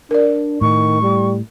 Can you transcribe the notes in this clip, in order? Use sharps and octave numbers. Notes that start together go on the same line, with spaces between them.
D4 A#4 D5
A2 D#3 C#6
G3